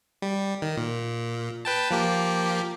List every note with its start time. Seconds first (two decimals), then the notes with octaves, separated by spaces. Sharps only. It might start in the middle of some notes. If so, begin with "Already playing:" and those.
0.22 G3
0.62 D#3
0.77 A#2
1.65 B4 G5 A5
1.91 F3 A#3 G4